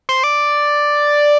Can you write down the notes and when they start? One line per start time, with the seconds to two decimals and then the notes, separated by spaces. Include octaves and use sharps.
0.09 C5
0.24 D5